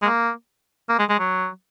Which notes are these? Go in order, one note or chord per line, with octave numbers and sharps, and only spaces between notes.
G#3
A#3
A#3
G#3
G#3
F#3